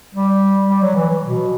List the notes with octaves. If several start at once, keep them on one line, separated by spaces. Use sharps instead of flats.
G3
G3
F#3
E3
B2